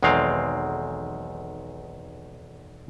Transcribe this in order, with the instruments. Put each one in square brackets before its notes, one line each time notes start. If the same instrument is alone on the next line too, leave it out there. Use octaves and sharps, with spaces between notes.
[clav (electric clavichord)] B1 E2 D#3 G#3 C4 F5